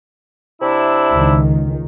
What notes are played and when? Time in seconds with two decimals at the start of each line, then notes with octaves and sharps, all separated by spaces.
0.61 C3 D4 E4
1.13 C#2 D#3